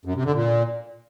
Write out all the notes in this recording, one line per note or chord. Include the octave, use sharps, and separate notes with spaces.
F#2
C3
D3
A#2